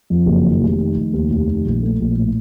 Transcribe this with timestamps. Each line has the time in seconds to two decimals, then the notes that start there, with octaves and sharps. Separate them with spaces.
0.10 F2
0.26 F#1
0.44 D#3
0.62 F1
0.78 D#3
0.95 F1
1.13 D#2
1.31 F1
1.47 D#3
1.65 A#1
1.82 A3
2.00 A#1
2.16 A2